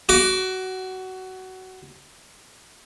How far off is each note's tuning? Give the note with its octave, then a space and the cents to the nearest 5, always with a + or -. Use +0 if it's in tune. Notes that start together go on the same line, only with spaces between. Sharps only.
F#4 +20 D6 -15